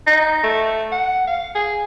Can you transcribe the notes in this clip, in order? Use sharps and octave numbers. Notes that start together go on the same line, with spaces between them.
D#4
A3
F#5
F5
G#4